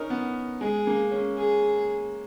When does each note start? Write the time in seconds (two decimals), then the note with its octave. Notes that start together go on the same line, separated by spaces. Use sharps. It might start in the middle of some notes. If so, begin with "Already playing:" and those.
Already playing: C#4 D#4 A#4
0.10 B3
0.61 G#3 G#4
0.87 A#3
1.11 C#4
1.38 G#4